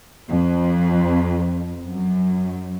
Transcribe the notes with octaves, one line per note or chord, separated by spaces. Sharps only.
F2
F#2